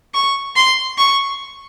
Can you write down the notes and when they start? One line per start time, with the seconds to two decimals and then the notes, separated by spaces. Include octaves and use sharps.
0.14 C#6
0.56 C6
0.98 C#6